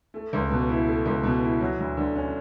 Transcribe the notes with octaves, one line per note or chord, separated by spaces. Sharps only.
A3
C#2
B2
E4
A3
C#2
B2
E4
F#3
D2
D3
C#4